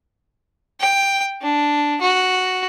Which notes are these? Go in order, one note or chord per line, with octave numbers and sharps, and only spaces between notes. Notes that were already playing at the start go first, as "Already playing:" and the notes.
G5
D4
F#4